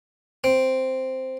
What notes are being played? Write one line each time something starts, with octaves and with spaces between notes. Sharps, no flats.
C4